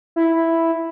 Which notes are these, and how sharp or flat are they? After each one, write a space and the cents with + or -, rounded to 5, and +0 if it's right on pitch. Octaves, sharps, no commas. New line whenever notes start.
E4 +0